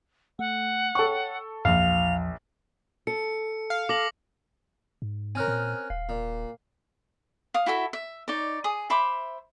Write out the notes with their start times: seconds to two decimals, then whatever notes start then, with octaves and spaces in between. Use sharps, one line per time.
0.39 A3 F#5
0.95 A4 C#5 G5 C#6
1.65 A#1 E2 F3 F5 F7
3.07 A4 C#7
3.70 F5
3.89 A4 D6 A#6 F#7
5.02 G#2
5.35 C4 C#4 A#4 G#5 F6 F#6
5.48 A#2
5.90 D#1 F5
6.09 A#2
7.54 F5 D#6
7.66 E4 F#4 A4 E5
7.93 E5
8.28 D#4 C#5 D5
8.64 G#4 D#6
8.90 C5 E5 B5 D6